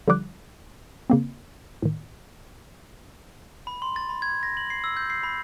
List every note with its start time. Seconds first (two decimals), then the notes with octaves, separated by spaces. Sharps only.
0.08 D3 F3 G3 D6 F#6
1.10 C#3 A#3 C4
1.82 A2 D#3
3.67 B5
3.82 C6
3.96 A6
4.09 B5
4.22 G#6
4.43 A#6
4.57 F#7
4.70 C7
4.84 E6
4.97 G6
5.10 C7
5.23 B5